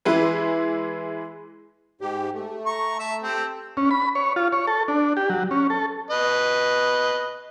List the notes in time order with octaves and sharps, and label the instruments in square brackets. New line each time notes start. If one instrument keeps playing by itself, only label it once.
[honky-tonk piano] E3 G#3 E4 B4
[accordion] G#2 G4
A3
[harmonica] A#5 C#6
E5 A5
C4 G4 A4
[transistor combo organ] C#4
B5
C#5
F4
C#5
A4
D4
G4
F#3
C#4
A4
[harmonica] B4 D#5